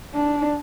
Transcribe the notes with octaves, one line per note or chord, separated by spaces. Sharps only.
D4